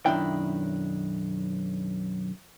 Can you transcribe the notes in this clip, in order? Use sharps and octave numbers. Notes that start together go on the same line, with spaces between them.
B1 F#2 D#3 D4 E4 G5